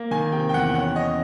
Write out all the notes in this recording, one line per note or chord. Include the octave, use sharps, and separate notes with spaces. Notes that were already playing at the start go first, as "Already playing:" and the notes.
Already playing: A#3
D#3 G#5
C3 G5
G5
E2 F#5
C#4 F#5
C#4 D#5